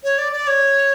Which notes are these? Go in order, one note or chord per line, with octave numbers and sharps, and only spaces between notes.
C#5
D5
D5
C#5